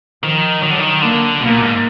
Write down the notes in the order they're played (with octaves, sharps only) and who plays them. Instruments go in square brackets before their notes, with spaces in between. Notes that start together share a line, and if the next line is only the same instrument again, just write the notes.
[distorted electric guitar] D#3 [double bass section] F3
[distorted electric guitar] D#3 [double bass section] F#3
[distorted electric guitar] D3
D#3
[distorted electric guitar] D3 [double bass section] A#3
[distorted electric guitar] B2 [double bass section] A#3
[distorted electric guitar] A#2
G#2